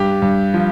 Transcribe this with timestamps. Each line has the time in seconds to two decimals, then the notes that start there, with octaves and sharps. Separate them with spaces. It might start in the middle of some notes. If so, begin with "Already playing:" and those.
Already playing: G2 G4
0.22 G2
0.54 F3